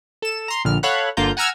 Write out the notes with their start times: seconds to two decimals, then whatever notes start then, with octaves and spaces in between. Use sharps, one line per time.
0.22 A4 E7
0.48 A#5 C6
0.65 A#1 D3 F6
0.83 A4 C#5 F5 F#5 B5 F#6
1.17 G1 D3 A#3 F4 A#5 G6
1.37 F#5 G#5 A#5 E6 F6 G#6